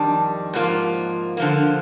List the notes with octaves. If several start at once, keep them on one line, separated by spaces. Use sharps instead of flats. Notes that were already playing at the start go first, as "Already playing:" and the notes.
Already playing: F2 D#3 G3 D4
G#2 F3 A#3 F4
D3 F3 A#3